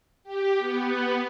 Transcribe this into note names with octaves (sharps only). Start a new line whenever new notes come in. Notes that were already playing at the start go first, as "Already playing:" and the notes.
G4
B3